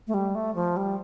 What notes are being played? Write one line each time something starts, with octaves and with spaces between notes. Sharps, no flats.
A3
G3
A3
F3
G3